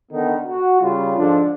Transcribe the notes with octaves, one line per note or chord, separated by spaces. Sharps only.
D3 D#3 B3 D#4
F#4
C#3 G3 F4
G#2 D3 F3 D4